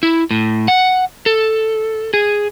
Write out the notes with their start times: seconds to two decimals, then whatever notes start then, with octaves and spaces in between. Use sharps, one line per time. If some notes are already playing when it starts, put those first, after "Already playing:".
0.03 E4
0.31 A2
0.68 F#5
1.26 A4
2.14 G#4